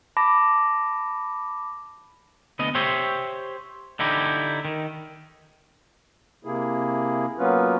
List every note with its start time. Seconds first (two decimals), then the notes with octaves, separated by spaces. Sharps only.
0.17 A5 B5 D6 A#6
2.59 D2 B3 D#5
2.75 G4 C5 C#5 E5
3.99 D3 D#4 E4 G4
4.65 D#3
6.45 C3 A#3 E4 G#4
7.38 F#3 A#3 B3 C#4 F4 B4